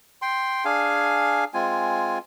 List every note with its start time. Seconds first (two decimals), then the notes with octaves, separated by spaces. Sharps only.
0.22 G5 C6
0.65 D4 G#4 F5 G#5
1.54 G#3 C4 F4 G#5